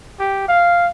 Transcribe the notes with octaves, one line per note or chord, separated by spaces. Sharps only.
G4
F5